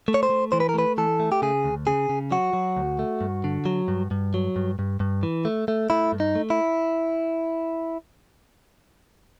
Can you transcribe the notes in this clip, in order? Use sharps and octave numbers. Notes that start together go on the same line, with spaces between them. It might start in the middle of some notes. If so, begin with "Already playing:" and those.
A3
C#5
C5
A3
E3 C5
B4
A#4
A3 B4
E3 A4
A3
G4
C#3 G#4
D2
C#3 G#4
C#3
F#3 F#4
F#3
D2
A3
G2
D3
F#3
G2
G2
F#3
G2
G2
G2
E3
A3
A3
A3 E4
G2
D#4
A3
E4